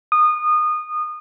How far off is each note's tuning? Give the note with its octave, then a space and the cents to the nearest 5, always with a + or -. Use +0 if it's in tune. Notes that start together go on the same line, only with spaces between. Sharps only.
D#6 -25